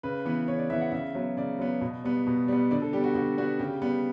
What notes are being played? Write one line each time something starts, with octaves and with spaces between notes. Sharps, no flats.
C#3 B4
E3 B3
C#3 C#5
D5
E3 B3 E5
F#5
C#3 E5
F#3 B3
C#3 D5
F#3 B3
B2
G3 B3
B2
G3 B3
D3 D5
A4
G3 B3 G4
F#4
D3 F#4
G3 B3 F#4
C#3 G4
G3 B3